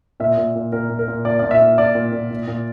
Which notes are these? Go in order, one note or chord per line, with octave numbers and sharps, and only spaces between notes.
A#2 E5
A#2
A#2
A#2 A#4
A#2
A#4
A#2
A#2 D5
A#2 D5
E5
A#2
A#2 D5
A#2
A#2
A#2
A#2